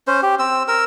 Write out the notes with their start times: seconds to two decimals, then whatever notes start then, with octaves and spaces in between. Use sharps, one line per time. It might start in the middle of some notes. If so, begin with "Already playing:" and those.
0.07 C#4 C5
0.23 G4
0.39 C4 E6
0.68 A#4 E6